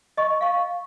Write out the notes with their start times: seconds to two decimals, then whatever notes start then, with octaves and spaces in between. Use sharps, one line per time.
0.17 D#5 C#6
0.41 F5 C#6